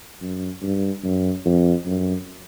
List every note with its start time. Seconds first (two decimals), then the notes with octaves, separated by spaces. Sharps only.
0.21 F#2
0.62 G2
1.04 F#2
1.45 F2
1.86 F#2